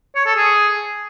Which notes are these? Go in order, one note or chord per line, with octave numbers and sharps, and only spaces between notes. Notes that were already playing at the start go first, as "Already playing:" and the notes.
C#5
A4
G#4